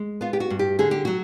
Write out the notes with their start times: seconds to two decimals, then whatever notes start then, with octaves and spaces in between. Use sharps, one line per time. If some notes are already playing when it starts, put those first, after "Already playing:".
Already playing: G#3
0.21 B3 F4
0.33 G4
0.40 F#4
0.50 G2
0.59 G4
0.79 D3 G#4
0.91 G4
1.05 F#3 F#4